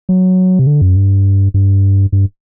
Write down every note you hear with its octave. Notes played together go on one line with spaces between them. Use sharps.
F#3
C3
D3
F#2
G2
G2
G2